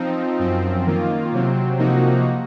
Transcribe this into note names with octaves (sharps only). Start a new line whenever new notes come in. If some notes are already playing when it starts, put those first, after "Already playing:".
Already playing: F3 C4 D#4
F#2 F3 C4
D#3 A#3 F4
C3 F#3 C4
C3 F3 A#3 D#4 F#4